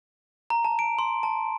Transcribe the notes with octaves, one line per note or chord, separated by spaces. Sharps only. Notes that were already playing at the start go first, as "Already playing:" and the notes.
A#5
A5
D7
C6
A5